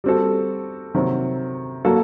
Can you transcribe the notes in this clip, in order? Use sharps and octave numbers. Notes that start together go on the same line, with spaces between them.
G3 C4 F#4 A4
C3 D#3 F#3 C4
F#3 A#3 F#4 A4